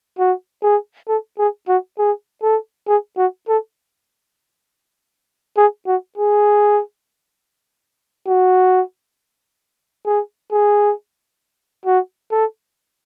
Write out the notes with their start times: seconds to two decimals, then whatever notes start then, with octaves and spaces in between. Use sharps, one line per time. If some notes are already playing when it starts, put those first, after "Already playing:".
0.19 F#4
0.63 G#4
1.08 A4
1.39 G#4
1.68 F#4
1.98 G#4
2.43 A4
2.88 G#4
3.17 F#4
3.48 A4
5.57 G#4
5.87 F#4
6.18 G#4
8.28 F#4
10.06 G#4
10.52 G#4
11.86 F#4
12.31 A4